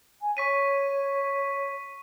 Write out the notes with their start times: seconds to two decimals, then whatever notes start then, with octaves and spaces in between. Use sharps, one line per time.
0.21 G#5
0.37 C#5 C#6 B6 D#7